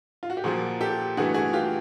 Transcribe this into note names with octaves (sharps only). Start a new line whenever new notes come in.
F4
F#4
G4
A#2 F3 A#3 F#4 G#4
G4 A4
G2 E3 A3 F#4 G#4
F#4 G#4
F4 G4